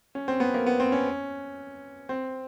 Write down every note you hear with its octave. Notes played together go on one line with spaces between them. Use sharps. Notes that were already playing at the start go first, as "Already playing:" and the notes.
C#4
C4
B3
A#3
B3
C4
C#4
C4